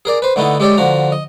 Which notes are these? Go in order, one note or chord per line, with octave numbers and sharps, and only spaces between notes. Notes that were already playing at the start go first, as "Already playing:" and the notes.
G#4 A#4 D5
B4 C5
D3 A3 B3 D#4 E4 A4
G#3 G4 A4 C#5 D5
D3 F3 F#4 A#5
D#5